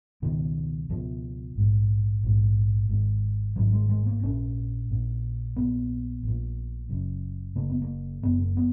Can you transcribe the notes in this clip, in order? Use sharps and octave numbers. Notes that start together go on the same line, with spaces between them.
C#2 B2 D#3
C#2 B2 F3
A#1 G#2
A#1 G#2
G#1 G#2
G#1 G#2 F#3
G#3
G#3
A#3
A#1 A#2 C#4
A#1 A#2
A#1 A#2 B3
A#1 A#2
F#1 F#2 C#3
F#1 F#2 C#3 A#3
B3
A#3
F#1 F#2 C#3 B3
A#3
B3